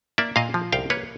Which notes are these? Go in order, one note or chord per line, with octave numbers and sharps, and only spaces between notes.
A#3 D5 E5
A#2 D#5 F5
F3
C2 F5 G5
A#3 B4 C#5